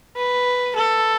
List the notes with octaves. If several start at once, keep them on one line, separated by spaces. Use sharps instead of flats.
B4
A4